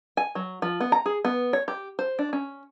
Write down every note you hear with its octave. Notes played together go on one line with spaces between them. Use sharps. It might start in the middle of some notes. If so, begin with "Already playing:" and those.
G#5
F#3
F3
B3
A#5
G#4
B3
C#5
G4
C5
D4
C#4